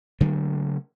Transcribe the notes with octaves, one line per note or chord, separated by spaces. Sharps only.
C#3 F#3 A3 A#3